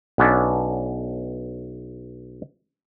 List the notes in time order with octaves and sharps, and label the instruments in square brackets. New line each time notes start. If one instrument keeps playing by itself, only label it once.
[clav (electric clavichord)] B1 B3 C#4 D4 A4